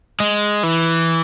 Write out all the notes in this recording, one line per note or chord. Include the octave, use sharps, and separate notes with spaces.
G#3
E3